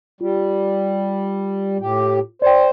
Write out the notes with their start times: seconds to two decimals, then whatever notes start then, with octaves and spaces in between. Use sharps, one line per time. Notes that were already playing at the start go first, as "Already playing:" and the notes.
0.21 G3 F4
1.79 A2 G4
2.42 C5 D5 G5